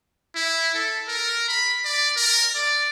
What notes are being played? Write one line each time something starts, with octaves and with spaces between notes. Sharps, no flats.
E4
A4
A#4
B5
D5
A#4
D5